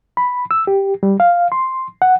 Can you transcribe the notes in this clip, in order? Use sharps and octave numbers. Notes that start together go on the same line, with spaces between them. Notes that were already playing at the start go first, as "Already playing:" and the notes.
B5
E6
G4
G3
F5
C6
F#5